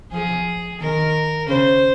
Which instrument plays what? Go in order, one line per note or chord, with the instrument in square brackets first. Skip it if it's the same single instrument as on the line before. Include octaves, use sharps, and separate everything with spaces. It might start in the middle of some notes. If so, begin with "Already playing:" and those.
[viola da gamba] F3 [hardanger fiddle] G#4
[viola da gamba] D#3 [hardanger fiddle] A#4
[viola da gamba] C#3 [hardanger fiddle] C5